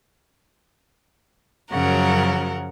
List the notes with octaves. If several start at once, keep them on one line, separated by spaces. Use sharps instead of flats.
F#2 C#3 F3 F#3 A#4 F#5